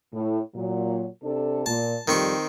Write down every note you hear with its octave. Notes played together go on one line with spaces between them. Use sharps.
A2
A#2 F#3
C3 D4 A4
A#2 A5
F2 D#3 G3 C4 C#6